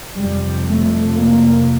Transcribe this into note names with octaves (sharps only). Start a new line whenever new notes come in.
F2 C3 G3
A3
A#3